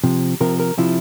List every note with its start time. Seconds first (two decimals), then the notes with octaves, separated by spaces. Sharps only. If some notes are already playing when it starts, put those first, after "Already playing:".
0.04 C3 F3
0.40 C3 F3 A#4
0.60 A#4
0.78 C3 F3 E4